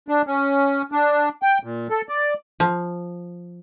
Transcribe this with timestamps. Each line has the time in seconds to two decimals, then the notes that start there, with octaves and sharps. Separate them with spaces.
0.08 D4
0.27 C#4
0.92 D4
1.42 G5
1.63 A#2
1.90 A4
2.09 D5
2.60 F3